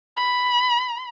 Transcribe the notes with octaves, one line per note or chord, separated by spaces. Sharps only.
B5